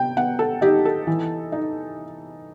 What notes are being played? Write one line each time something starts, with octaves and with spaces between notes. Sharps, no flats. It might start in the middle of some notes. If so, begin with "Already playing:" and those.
Already playing: C3 B3 G5
B3 F#5
A4
D#4 G4
A4
E3
D#4